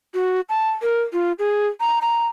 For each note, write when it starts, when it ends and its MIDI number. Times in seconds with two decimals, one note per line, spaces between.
0.14 0.40 66
0.49 0.70 81
0.82 1.02 70
1.13 1.32 65
1.39 1.67 68
1.80 1.99 82
2.02 2.26 82